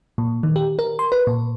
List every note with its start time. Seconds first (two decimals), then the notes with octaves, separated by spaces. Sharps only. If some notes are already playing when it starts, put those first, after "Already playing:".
0.18 A#2
0.43 D#3
0.56 G4
0.79 A#4
0.99 C6
1.12 B4
1.27 A#2